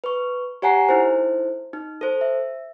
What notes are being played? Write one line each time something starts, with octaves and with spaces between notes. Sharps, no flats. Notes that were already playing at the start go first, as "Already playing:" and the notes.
B4 C#6
G4 C#5 F#5 G#5 A#5 C7
D#4 E4 A4 C5
D#4
A4 C5
E5